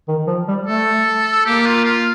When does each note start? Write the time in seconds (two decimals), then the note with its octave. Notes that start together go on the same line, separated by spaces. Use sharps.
0.08 D#3
0.27 F3
0.48 G3
0.67 A3 A4
1.45 A#3 G4
1.66 F4
1.85 F4